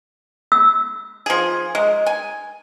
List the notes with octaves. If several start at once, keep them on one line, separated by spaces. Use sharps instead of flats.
E6
F3 G#4
G#3
G#5